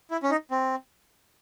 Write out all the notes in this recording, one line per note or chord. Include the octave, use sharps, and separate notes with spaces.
E4
C#4
D#4
C4